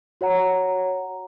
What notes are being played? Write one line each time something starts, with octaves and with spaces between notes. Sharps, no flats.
F#4 C#5 F#5 A#5